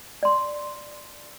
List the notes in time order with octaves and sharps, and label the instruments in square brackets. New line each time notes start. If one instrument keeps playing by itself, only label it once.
[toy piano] D5 C6